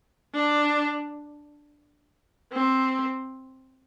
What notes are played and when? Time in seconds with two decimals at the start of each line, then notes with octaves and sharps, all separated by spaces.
0.35 D4
2.53 C4